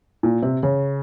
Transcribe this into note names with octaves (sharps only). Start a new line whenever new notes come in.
A#2
C3
C#3